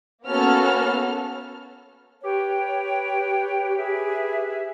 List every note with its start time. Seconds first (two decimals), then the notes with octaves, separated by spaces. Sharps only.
0.25 A#3 B3 C#4 F#4 A4 F6
2.23 G4 B4 C#5 G5
3.78 G#4 B4 E5